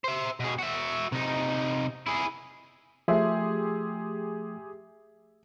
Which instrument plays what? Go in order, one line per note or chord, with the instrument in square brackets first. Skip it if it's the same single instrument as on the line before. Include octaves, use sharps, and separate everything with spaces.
[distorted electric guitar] C5 E5
B2 G#4
F#4 E5
C3 D#4
E4 G#4
[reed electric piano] F3 A3 [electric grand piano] G4 G#4 C6 [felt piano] E5